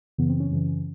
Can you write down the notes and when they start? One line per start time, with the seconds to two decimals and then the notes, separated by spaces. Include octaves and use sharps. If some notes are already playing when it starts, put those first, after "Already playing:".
0.18 F#2 C#3 E3 B3
0.29 C4
0.40 C#4
0.50 F#2 C#3 E3